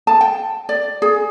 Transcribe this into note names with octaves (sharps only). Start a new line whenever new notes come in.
A5
G5
D5
G#4